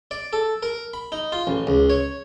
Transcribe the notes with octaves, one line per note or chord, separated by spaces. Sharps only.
D5
A4
A#4
B5
D#4
F4
A1
C#2
C#5